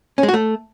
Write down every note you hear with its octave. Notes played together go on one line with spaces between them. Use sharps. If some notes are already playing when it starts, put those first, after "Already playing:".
C#4
G#3
F#4
A3